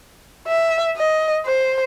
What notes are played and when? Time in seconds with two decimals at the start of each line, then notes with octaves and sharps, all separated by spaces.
0.48 E5
0.97 D#5
1.46 C5